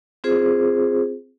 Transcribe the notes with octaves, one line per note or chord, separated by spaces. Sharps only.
C4 F4 G#4 C5